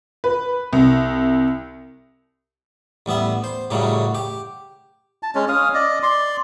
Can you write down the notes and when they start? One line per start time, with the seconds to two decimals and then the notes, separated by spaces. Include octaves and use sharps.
0.24 B4
0.73 C2
3.06 A1 G3 B3 E5
3.44 C5
3.70 F#2 A2 C#3 F#3 G3
4.15 G4
5.23 A5
5.35 G#3 C#4
5.48 C#4 F5 D#6
5.74 D5 D#5
6.03 D5 C6